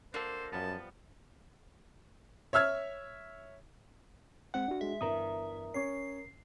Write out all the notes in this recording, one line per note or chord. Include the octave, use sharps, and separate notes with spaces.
A#3 D4 F#4 A4 C5
F#2 F3 G3 B3 A5
C#5 E5 E6 F6 G#6
G#3 C4 F#5 F#6
D4 F#4
G#3 E5
G1 E3 A#4 A#5 D#6
C#4 C#5 C#6 C7